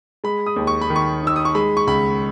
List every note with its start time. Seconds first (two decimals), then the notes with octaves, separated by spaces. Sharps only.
0.24 G#3 B5
0.46 D#6
0.56 D#2
0.67 C#6
0.81 B5
0.90 D#3
0.96 C#6
1.22 D#4 E6
1.36 D#6
1.45 C#6
1.55 G#3 B5
1.77 C#6
1.87 C#2 B5